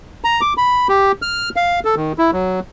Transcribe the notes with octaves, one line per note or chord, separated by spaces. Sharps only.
A#5
D6
B5
G4
F6
F5
A4
D#3
E4
F#3